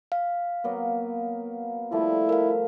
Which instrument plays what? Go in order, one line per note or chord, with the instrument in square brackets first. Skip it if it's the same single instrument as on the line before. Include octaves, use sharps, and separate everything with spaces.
[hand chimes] F5
[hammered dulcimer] F#3 A#3 B3
[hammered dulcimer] F3 G3 A3 [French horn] E4
[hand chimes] A#4 F5